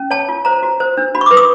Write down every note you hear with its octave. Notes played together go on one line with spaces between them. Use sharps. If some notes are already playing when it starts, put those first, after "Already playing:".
Already playing: C#4
C#5 A5
F4
C5 A#5
F#4
C5
D4
F#4 B5
C#6
B4 D6
D#6